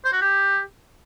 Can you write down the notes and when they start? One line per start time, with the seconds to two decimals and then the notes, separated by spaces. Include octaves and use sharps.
0.04 C5
0.13 F#4
0.21 G4